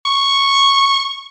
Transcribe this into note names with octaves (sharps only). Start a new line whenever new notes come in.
C#6